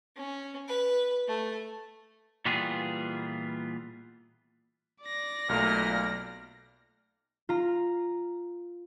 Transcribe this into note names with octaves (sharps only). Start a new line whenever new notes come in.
C#4
B4
A3
A#2 E3 G3 B3 F4 G#4
D5 A#6
B1 A#2 A3 F6
F4 A#5